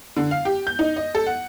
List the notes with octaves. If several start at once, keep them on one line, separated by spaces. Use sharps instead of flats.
D3
F5
G4
G6
D#4
D#5
A4
F#5